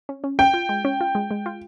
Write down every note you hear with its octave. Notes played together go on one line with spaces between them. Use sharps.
C#4
C#4
C#4 G5
F4
G#3
C#4
F4
G#3
G#3
F4